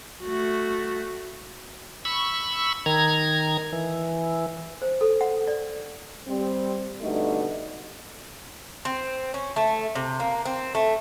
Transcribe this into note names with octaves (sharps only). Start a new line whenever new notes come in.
A3 F#4
B5 C#6 E6
D#3 A#5 G#6
E3
C5
A4
F#5
D5
G3 C4
B2 D3 G3 A3 D#4
C4
C#4
A3
C3
A#3
C4
A3